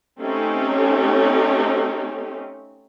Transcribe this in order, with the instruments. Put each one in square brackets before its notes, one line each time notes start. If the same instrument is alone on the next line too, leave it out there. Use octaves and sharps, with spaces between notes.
[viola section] A3 C4 C#4 D#4 G4